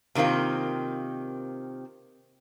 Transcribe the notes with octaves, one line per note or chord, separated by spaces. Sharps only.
C3 D#3 A#3 C4 F4